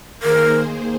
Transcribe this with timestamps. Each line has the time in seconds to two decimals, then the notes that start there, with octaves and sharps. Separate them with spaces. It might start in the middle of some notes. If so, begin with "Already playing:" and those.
0.23 D#3 A#3 G#4 A#4 C5